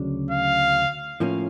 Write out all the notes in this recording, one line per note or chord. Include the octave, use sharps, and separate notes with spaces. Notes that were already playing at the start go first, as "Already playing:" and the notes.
Already playing: D2 C#3 F#3 D4
F5
A2 F3 A#3 C#4